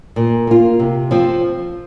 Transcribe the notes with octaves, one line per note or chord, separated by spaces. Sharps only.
A#2
A#3 F4
C3
F3 C4 F4